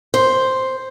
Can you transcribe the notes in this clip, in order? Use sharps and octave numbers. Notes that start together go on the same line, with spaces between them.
C5